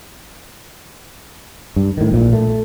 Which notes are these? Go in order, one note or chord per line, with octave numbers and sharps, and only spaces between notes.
G2
A2 D#3
A#1 A#2
A3